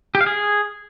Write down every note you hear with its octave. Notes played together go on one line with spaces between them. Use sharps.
G4
F5
G#4